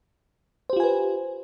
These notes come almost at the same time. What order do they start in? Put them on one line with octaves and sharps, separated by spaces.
C5 G4 F4 G#5 B4